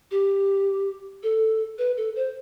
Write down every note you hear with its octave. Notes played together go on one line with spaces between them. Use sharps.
G4
A4
B4
A4
C5